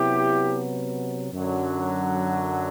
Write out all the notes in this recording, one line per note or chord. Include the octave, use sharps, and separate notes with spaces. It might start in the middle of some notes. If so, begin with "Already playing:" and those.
Already playing: C3 F#3 B3 E4 G4
F#2 D3 F#3